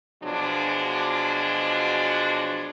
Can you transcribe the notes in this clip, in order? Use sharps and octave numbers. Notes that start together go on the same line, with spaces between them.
B2 F3 F#3 G#3 D4